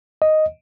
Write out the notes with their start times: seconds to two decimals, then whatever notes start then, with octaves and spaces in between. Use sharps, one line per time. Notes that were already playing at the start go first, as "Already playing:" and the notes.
0.22 D#5